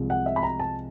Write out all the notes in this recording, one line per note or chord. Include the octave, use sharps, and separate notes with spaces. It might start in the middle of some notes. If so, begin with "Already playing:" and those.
Already playing: C2 C3 F3 G#3
F#5
E5
B5
A#5
A5